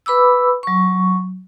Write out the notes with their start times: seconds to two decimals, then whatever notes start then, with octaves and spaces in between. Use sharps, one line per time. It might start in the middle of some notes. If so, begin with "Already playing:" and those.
0.06 B4 B5 D6 E6
0.63 F#3 C#6